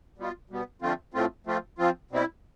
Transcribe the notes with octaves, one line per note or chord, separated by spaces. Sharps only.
B2 G3 B3 F4
B2 G3 B3
D3 F3 A3 C4 F4
A2 F3 A3 C4 F4
F3 A3 C4 F4
F3 C4 F4
B2 G3 C4 E4